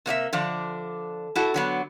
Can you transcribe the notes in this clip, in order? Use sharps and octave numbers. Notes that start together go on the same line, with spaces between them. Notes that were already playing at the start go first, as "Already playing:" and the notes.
C3 A#3 D5 E5
D3 F3 D4
E4 F#4 A4
D3 F#3 B3